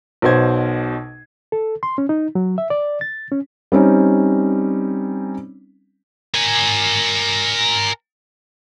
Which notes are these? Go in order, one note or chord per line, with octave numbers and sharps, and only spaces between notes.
B1 B2 C5 G#6
A4
C6
C#4
D#4
F#3
E5
D5
A6
C#4
G3 C4 C#4 D#4
A#4 G#5